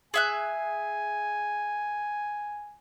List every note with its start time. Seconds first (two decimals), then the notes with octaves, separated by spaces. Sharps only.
0.14 G#4 E5 G#5 F#6